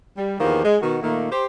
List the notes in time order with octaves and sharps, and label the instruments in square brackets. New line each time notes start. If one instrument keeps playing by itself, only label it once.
[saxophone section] G3
E2 D#3 F3 A#3 G4
G#3
B2 D#3 F#4
A#2 D#3 A3 A#3
G4 C5